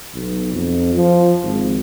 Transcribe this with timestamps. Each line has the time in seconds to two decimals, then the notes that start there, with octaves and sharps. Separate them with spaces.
0.14 B1
0.54 F2
0.95 F3
1.43 G#1